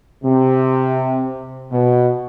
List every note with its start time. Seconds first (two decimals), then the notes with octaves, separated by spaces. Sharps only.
0.24 C3
1.71 B2